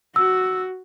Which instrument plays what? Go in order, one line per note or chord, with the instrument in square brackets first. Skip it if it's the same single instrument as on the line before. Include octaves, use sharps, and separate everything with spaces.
[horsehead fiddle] F#4 [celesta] E6